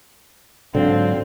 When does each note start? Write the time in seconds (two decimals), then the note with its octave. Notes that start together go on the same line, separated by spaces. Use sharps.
0.75 G#2 D3 F#3 C4 F4